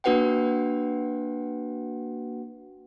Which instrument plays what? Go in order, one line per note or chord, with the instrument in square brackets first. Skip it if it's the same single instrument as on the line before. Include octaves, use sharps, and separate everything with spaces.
[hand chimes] A#3 D4 F#4 B4 F#5 G5